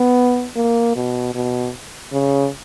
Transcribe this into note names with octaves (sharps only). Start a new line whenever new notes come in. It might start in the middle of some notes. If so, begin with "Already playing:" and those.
Already playing: B3
A#3
B2
B2
C#3